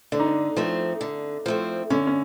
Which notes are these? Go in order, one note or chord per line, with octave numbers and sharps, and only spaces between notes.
D3 D4
D#4
D4
F3 A3 C4
D3
F3 A3 C4
D3 C#4
C#4